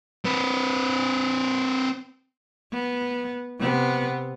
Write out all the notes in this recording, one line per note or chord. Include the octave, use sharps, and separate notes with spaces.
C4 B4
B3
C3 B3